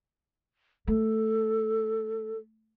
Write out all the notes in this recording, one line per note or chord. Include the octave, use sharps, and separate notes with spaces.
A3 A4